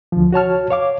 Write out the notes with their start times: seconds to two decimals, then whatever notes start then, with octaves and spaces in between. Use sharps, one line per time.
0.12 D2 F3
0.32 F#4 C#5 A5 F6
0.71 C#5 F5 D6